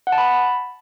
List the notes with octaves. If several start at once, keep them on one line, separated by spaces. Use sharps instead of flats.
F#5
A5
B5